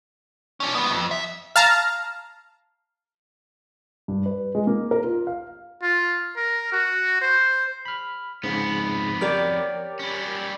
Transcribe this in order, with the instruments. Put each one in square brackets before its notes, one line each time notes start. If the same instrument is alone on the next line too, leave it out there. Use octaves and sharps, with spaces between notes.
[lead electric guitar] C#4 D4
G3 B3
F2
E5
[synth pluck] F5 A5 A#5
[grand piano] G2
B4
G#3
A#3
A#4
F4
F5
[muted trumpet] F4
A#4
F#4
C5
[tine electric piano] B5 F6
[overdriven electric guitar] F2 B3 [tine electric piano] G#2 C#3
[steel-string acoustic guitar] G4 C#5 D5 [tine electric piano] A#4 G5 D6
[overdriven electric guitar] G3 C#4